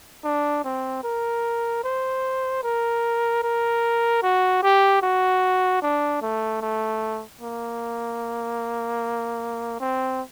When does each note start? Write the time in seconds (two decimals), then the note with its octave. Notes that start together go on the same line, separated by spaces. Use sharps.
0.24 D4
0.65 C4
1.04 A#4
1.84 C5
2.63 A#4
3.43 A#4
4.23 F#4
4.63 G4
5.02 F#4
5.82 D4
6.22 A3
6.61 A3
7.41 A#3
9.80 C4